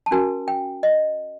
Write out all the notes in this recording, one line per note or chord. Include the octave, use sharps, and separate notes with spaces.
A5
C#4 F#4 A#4 G#5
G5
D#5